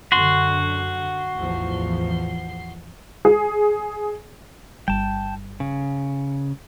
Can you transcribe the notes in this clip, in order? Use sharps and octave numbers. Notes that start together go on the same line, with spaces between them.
F#2 D3 F#4 C6
A1 E2 F3
G#4
G1 G3 G5 A5
C#3